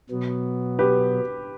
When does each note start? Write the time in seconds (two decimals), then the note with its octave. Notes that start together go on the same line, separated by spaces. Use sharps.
0.10 B2 F#3 B3
0.79 G4 B4